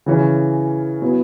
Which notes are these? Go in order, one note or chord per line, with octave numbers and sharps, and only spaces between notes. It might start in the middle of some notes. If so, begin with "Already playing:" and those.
C#3 E3 C#4
B2 B3 E4 C#5